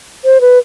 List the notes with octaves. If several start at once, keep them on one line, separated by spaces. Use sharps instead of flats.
C5
B4